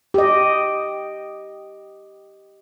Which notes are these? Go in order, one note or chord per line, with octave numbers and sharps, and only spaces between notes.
G4 D#5